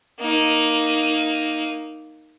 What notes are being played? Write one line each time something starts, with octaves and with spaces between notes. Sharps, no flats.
A#3 D#4